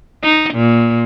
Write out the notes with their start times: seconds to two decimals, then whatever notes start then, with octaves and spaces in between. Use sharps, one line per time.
0.23 D#4
0.54 A#2